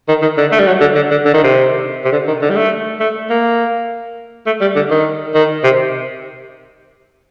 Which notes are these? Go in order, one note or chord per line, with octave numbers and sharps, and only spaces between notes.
D#3
D#3
D3
A3
G3
F#3
D3
D3
D3
D3
D#3
C3
C3
D3
D#3
D3
G3
A3
A3
A#3
A3
G3
D3
D#3
D#3
C3